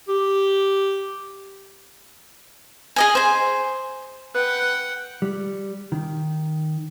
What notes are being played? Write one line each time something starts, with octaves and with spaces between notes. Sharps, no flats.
G4
G#4 D#5 G#5
C5 G#5
B4 F#5 G5
G3
D#3